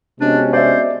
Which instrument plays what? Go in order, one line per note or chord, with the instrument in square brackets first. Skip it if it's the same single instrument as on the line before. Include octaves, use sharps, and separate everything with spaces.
[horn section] C3 G#3 C#4 [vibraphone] B3 F#4 D#5 [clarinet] D4
[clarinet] C5 [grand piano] D5 E5